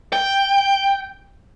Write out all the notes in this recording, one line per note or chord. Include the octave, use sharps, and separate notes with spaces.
G5